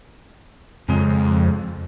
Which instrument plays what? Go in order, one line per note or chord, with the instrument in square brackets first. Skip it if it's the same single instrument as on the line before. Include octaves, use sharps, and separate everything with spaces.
[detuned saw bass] F2 [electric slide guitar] C#3 G#3